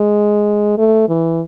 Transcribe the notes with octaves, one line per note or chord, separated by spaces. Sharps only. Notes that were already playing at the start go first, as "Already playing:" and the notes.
Already playing: G#3
A3
E3